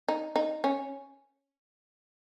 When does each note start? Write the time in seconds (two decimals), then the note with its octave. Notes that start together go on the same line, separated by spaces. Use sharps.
0.09 D#4
0.36 D#4
0.64 C#4